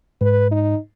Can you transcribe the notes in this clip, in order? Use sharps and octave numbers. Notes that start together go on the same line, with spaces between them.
G#2 B4
D#4